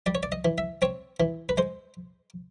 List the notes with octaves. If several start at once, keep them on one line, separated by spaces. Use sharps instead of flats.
G3 D5
C#5
D5
D#5
E3
E5
C4 C#5
E3
B4
G#3 C5